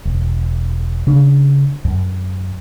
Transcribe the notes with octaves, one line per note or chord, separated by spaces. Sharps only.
E1
C#3 D4
F#2